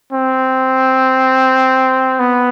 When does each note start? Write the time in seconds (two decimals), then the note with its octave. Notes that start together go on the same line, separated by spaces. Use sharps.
0.13 C4
2.19 B3